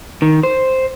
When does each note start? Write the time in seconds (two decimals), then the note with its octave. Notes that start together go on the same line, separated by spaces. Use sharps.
0.22 D#3
0.43 C5